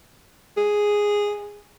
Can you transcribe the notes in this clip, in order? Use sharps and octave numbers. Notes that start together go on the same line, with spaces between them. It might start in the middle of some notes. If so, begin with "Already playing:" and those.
G#4